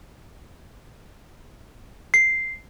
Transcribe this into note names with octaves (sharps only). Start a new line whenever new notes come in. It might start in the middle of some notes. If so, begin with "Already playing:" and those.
C7